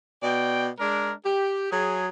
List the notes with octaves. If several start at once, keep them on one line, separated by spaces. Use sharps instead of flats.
B2 D5 G5
G#3 D4 A#4
G4
F#3 G#4